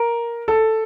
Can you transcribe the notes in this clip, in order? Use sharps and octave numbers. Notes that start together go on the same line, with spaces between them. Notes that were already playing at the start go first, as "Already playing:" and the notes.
Already playing: A#4
A4